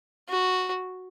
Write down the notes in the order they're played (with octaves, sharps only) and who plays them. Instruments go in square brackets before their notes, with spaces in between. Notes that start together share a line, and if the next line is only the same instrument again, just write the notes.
[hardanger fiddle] F#4